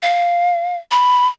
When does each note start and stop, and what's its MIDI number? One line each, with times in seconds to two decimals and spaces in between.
0.02 0.76 77
0.91 1.28 83